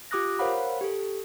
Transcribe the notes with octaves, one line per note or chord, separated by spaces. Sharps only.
F4 G4 D6 D#6 F#6 A#6
A#4 C5 C#5 F5 F#5 B5
G4 A4